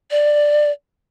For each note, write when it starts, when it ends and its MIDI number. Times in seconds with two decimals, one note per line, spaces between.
0.11 0.71 74